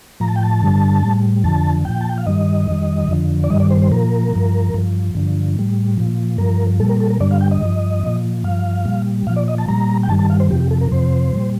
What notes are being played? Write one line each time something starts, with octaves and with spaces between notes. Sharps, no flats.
A2 F3 A#5
A5
G5
A5
G2 D3 G3
A2 G3
F2 D3 F3 A5
A#2 F3 G5
A5
G5
F5
G2 D#3 G3 D#5
F2 D#3 G3
F2 D3 F3
D5
G2 D#3 G3 D#5
D5
C5
C5
A#2 F3 A#4
G2 F3
G2 F3
G2 D3 F3
A2 G3
A#2 F3
G2 F3 A#4
A#2 G3 A4
A#4
A4
A#4
G2 D3 G3 D5
F5
G5
D#5
G2 F3
A#2 F3
G2 F3 F5
A#2 G3
A#2 F3 F5
D5
D#5
A5
A#2 G3 A#5
G5
G2 D#3 G3 A5
A5
F5
C5
F2 C3 F3 G4
G4
A4
A#4
F2 C3 F3 C5
A#2 G3